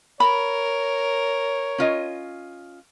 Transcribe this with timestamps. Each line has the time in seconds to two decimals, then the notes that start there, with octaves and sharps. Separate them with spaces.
0.20 A#4 C#5 B5
1.78 C#4 F4 D#5